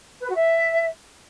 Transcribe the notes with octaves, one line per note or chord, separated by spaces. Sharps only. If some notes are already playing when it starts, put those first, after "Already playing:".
B4
F#4
E5